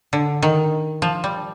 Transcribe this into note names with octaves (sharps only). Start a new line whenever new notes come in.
D3
D#3
F3
G3